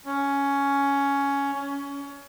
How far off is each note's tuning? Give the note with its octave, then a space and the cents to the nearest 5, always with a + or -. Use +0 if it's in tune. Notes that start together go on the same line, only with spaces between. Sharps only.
C#4 +10
C#4 +20